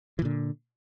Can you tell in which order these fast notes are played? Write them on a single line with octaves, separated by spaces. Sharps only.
E3 A#2 D3